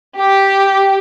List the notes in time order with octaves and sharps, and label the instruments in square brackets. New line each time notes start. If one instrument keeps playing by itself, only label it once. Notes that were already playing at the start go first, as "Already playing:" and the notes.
[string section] G4